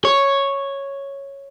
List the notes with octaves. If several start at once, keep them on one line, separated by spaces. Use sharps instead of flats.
C#5